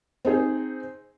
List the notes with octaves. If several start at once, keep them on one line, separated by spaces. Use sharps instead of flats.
C4 D#4 G#4